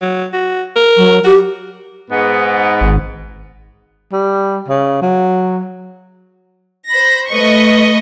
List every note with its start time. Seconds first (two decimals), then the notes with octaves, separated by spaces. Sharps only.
0.02 F#3
0.33 F#4
0.76 A#4
0.97 F#3
1.24 F#4 G4
2.10 G#2 B3
2.81 G#1
4.12 G3
4.68 C#3
5.02 F#3
6.89 C5 B5 A#6
7.29 A3 B4 D#5 C#6